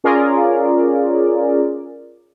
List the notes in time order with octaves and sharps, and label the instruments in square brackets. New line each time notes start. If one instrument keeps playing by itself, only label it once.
[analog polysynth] C#4 F4 G#4 A#4 D5